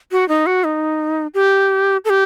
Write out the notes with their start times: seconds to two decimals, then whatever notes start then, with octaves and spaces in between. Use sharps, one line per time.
0.12 F#4
0.29 D#4
0.46 F#4
0.64 D#4
1.34 G4
2.05 A4
2.10 G4